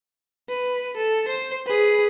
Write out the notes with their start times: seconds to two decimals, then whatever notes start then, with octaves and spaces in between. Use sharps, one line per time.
0.49 B4
0.97 A4
1.28 C5
1.66 G#4 B4